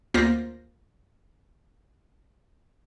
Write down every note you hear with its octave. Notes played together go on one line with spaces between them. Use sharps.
D2 A#3 F4 C5 A#6